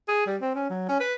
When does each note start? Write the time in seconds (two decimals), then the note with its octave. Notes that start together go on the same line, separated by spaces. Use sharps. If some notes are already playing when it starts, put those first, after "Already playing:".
0.08 G#4
0.27 G3
0.42 C4
0.55 C#4
0.70 F#3
0.89 C#4
1.00 B4